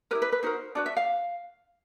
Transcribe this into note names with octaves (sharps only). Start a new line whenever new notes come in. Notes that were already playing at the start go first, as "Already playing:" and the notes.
E4 G4 A#4 B4
B4
B4
D#4 F#4 A#4 C5
D4 F#4 B4 D5
E5
F5